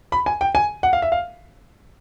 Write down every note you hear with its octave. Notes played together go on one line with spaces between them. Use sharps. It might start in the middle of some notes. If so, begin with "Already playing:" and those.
B5
G#5
G5
G#5
F#5
F5
E5
F5